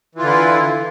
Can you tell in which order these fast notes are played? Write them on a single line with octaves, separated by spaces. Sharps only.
E3 F4 D3 E4